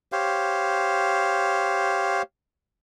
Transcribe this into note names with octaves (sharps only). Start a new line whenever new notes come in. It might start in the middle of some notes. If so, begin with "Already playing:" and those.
G4 C5 C#5 F5